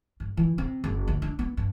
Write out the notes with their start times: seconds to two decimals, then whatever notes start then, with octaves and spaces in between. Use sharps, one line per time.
0.20 G2
0.37 E3
0.58 C3
0.84 F#1
1.08 D2
1.22 D4
1.39 B3
1.57 G2